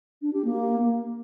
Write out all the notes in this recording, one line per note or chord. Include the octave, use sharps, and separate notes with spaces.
D4
G4
A#3